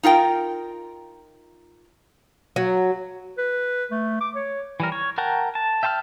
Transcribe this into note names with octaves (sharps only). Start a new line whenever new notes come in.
D#4 F4 A#4 G5
F#3
B4
A3
D6
C#5
E3 G3 A#4
C#5
A#4 F#5 G5 A5 A#5
A5
E5 G5 A5 C6 F6